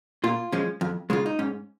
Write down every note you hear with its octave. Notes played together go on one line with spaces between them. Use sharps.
A#2 F4
F3 G#3 C#4
F2
C#3 G#3 F4
D#4
G#2 C#4